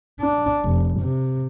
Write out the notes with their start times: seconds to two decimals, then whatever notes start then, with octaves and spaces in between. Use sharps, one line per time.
0.20 D4
0.64 F1
1.01 C3